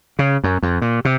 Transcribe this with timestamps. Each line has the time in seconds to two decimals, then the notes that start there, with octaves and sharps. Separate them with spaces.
0.19 C#3
0.44 F#2
0.63 F2
0.82 A#2
1.05 C3